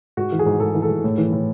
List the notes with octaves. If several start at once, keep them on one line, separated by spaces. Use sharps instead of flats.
G#2 F#4
E3
G#4
G#2
G#2 A4
E3
A4
G#2
A2
E3
A2